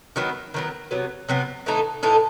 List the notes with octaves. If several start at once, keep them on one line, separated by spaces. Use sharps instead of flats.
D#3 F#3 B3
D#3 F#3 B3
C3 F#3 B3
C3 F#3 B3
A2 E3 A3 D#4
A2 E3 A3 D#4